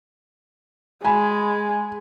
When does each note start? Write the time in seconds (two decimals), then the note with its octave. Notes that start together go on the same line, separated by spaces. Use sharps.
1.05 G#3 G#5 B5